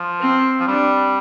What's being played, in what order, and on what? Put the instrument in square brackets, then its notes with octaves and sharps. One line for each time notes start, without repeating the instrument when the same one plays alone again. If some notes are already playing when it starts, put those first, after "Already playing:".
Already playing: [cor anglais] F3
[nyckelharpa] C4
[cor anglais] F3
[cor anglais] G3 [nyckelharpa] D4